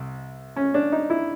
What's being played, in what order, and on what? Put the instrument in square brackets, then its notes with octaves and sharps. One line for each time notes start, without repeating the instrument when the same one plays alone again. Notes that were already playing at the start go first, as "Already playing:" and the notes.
Already playing: [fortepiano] C2
C#4
D4
D#4
E4